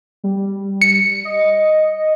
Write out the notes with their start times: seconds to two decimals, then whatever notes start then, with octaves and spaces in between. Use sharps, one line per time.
0.24 G3
0.82 C#7
1.25 D#5